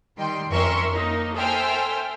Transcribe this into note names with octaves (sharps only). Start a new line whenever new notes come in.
D#3 G3 G5 C6
F2 C#4 A#4 E5 C6 C#6
A#3 D#4
A4 C5 E5 G5 G#5 F6